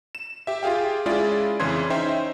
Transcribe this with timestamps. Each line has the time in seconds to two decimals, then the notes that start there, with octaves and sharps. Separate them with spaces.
0.15 E7
0.47 G4 E5
0.63 F4 G4 G#4 F5 G5
1.06 G#3 C#4 E4 F4 G#4 D5
1.60 F2 C#3 E3 C#4 C6 G#6
1.90 C#4 D#4 C5 E5 G5 C6